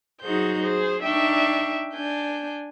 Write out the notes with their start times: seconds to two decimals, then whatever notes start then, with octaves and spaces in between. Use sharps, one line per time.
0.21 F#3 D#4 F#4 G#4 C5 G6
0.62 G#4 C5
1.02 D4 D#4 E5 G5 C#6
1.94 D4 G#5 G6